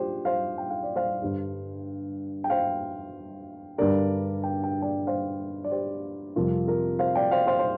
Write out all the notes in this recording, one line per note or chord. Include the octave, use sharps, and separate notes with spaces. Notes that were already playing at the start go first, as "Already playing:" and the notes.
Already playing: D4 F4 G4 C5
C5 F5
G5
F5
D5
C5 F5
G2 D3 G3
G5
C5 F5
G2 D3 G3 A#4 D5
G5
G5
D5 G5
C5 F5
D5
G4 C5
F2 C3 G3 F4 A#4
F4 A#4
C5 F5
D5 G5
C5 F5
C5 F5
C5